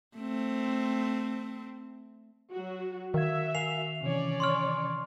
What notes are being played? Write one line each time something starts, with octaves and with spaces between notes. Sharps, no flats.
A3 C4
F#3 F#4
D#3 F#4 A#4 E5 F5 G#6
A#4 F5 G#5 C7 F7
C3 E3 C#4 C#5 D5
C6 C#6 F6